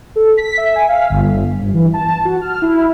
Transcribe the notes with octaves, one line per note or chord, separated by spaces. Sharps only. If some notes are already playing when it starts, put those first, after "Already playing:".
A4
B6
E5
G#5
F5
G1
G2
E3
A5
F#4
F6
E4